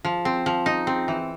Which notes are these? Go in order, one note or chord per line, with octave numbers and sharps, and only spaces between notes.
F3
C4
F3
D#4
C4
E3